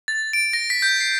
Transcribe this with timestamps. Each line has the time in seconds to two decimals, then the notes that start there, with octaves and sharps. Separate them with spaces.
0.08 A6
0.33 D7
0.53 A#6
0.70 B6
0.82 G6
1.01 C7